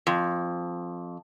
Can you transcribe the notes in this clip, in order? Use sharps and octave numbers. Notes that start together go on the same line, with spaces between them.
F2